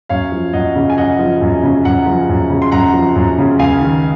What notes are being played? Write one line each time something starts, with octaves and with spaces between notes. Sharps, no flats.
F#2 C#5 F5
F3
F#2 D#5 F#5
C#3
G#5
F#2 D#5 F#5
F3
F#2
C#3
F#2 F#5 A#5
F3
F#2
C#3
C6
F#2 F#5 A#5
F3
F#2
C#3
C#2 F5 G#5
D#3